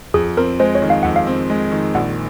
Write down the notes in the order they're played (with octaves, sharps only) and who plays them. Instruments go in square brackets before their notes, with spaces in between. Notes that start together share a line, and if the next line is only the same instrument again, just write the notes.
[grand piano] F2 [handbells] G#4
[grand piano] C4 [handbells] A#4
[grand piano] G#3 [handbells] C5
[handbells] C#5
[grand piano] D#3
[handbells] F5
[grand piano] F2 [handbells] F#5
[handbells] F5
[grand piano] C4
G#3
D#3
[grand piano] A#1 [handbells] F#5